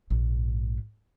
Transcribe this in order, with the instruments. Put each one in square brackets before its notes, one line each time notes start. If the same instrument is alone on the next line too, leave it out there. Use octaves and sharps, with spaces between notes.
[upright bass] A#1 G#2